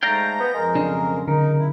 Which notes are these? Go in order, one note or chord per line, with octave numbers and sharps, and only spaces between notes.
G#2 A3 D5 F5 G5 A#5 G6 A#6
B3
F2 G#3 A#4
B1 C#3 D4
D3 D#4 A#4
E4